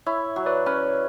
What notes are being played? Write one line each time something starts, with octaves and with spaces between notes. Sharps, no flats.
E4 C#5 E5
F#3
B4 D5
C#4 B4